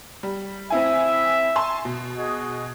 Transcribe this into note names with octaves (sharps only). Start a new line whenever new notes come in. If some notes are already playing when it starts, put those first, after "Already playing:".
G3
C4 E4 E5 G#5
G#5 A5 C6
B2
F#4 G#4 D#5